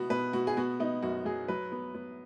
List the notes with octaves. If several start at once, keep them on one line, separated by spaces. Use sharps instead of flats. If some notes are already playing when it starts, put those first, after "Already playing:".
Already playing: B2 B3 F#4
B2 B4
B2 F#4
G#4
B3 F#4
B3 D#4
F#2 F#4
F#3 G#4
F#3 B4
B3
B3